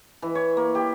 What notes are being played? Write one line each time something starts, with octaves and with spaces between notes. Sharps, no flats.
E3
C#5
A#3
G4